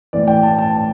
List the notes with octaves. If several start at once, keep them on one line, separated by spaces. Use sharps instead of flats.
A2 E3 D5
G5
A5
A5